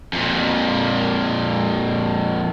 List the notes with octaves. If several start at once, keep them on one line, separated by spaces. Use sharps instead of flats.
F2 A#2